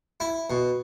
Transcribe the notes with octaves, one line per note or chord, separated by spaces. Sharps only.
E4
B2